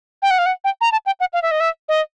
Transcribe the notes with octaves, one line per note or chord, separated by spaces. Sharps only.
G5
F#5
F5
F#5
G5
A#5
A5
G5
F#5
F5
E5
D#5
E5
D#5